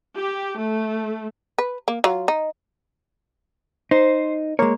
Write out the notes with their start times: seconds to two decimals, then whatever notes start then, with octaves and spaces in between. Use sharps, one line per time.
0.18 G4
0.61 A3
1.58 B4
1.88 A#3
2.04 F#3 F4
2.28 D#4
3.91 D#4 C5
4.59 G#3 A#3 C#5